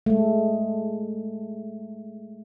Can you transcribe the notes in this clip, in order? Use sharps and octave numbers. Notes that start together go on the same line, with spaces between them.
G#3 A3